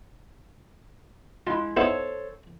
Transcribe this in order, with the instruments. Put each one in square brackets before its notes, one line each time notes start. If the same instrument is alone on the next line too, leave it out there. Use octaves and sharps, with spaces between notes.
[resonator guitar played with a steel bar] G#3 E4 [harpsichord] F4
[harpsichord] B3 D#4 E4 [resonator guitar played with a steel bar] A4 C5 C#5